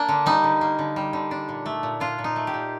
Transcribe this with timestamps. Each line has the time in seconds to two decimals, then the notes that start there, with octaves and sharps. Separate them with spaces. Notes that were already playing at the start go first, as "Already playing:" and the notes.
Already playing: A#3 D4
0.09 D3
0.26 G3 D#4
0.44 D3
0.61 A#3
0.79 D3
0.96 G3
1.13 D3
1.31 D4
1.49 A#2
1.66 A3
1.83 A#2
2.00 D4 F4
2.18 A#2
2.24 D#4
2.36 A3
2.47 G4
2.54 A#2